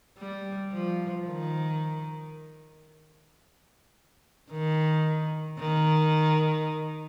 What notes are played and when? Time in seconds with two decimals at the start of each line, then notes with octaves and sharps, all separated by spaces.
0.18 G3
0.72 F3
1.27 D#3
4.51 D#3
5.59 D#3